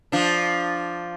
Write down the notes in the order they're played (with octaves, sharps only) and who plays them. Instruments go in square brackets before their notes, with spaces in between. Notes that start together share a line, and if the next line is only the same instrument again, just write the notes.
[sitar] F3 D4